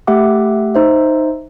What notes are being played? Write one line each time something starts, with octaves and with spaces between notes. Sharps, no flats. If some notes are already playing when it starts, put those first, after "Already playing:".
A3 G4 E5 F#5 D6
D#4 C5 E5